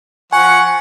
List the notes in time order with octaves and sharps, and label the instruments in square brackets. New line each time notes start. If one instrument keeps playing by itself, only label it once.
[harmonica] F3 F#5 C#6 [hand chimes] G#5